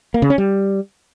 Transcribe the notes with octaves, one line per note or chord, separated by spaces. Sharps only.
A#3
C#3
C#4
G3